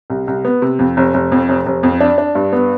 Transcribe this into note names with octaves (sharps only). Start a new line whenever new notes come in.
C2
C2
B3
C3
F2
F1
F1
F2
F1
F1
F2
D4
D4
G2
B3